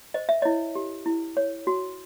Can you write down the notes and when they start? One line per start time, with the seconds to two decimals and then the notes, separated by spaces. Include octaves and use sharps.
0.14 C5 D#5
0.29 E5
0.42 E4 C#5 D#5
0.75 G4
1.06 E4
1.37 C#5
1.67 F#4